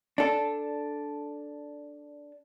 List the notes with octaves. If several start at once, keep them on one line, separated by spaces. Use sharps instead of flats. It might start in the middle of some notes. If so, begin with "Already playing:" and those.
D4 A4